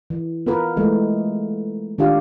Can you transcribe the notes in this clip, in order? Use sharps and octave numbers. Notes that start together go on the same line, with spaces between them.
E3
B3 F4 A#4 B4
E3 G#3 A3 B3
D#3 D4 F4 G4 F5